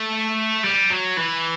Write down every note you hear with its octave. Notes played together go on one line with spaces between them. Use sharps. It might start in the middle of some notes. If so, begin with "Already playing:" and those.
Already playing: A3
G3
F#3
E3